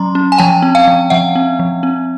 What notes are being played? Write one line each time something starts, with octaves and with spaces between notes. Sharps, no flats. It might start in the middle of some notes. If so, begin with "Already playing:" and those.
Already playing: F#3 C#4 A#5 C6
C#4
G#5
F3 G5 A5
C4
F5 G5
F3
F3 E5 F#5
C4
F3
C4